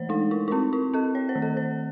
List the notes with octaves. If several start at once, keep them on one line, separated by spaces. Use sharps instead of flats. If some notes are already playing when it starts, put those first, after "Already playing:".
Already playing: E3 A3 C5
G#3 D#4
E4
E4
C4 D#4
E4
C4 A4
C#5
C5
D#3
A4
C5